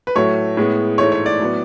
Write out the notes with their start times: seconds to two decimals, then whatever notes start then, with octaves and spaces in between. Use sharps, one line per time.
0.07 B4
0.15 A2 F#3 A3 C#5
0.57 A2 G#3 B3
0.98 G#2 E3 A3 C#5
1.12 C#5
1.26 D5
1.40 A2 F#3 B3